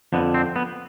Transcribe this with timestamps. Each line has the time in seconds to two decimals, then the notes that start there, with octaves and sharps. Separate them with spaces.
0.13 F2 D3 B3
0.34 C4
0.56 B3